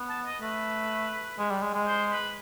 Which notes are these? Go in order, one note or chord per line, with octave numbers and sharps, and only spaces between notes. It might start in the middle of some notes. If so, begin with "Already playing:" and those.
Already playing: B3
A5
D#5
A3 B4
G#3
G3
G#3
G#3
C5
B4